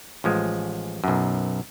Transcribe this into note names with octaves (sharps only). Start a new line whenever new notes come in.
A1 F3 G#3
B1 F#2